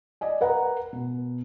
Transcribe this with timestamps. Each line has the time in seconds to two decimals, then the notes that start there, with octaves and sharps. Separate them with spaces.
0.21 D5 D#5 G#5
0.41 A#4 B4 F#5 A#5
0.93 B2